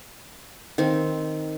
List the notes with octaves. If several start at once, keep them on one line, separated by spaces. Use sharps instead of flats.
D#3 C4